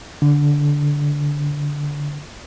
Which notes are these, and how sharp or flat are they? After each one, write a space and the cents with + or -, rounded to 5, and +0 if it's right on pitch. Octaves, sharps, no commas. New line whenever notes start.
D3 -15